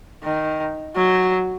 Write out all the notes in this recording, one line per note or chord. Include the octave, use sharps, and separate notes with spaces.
D#3
F#3